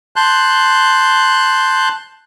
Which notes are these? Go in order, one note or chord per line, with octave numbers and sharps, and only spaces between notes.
A5 C6 F#6 G6